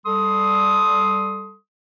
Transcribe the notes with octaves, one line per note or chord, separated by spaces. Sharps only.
G3 A4 C6 D#6